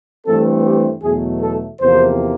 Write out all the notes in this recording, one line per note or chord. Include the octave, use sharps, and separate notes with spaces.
G2 E3 A3 C4 A4
G4
E2 B2 F#3 A3 G#4
A4
E2 C3 F3 A#3 C5